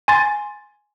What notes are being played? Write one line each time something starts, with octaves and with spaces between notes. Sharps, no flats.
G#5 C6 A6